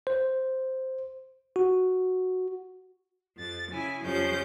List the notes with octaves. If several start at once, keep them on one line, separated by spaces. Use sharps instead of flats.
C5
F#4
F2 A6
C#3 E4 G#5
F2 C#3 F3 G3 C#4 G6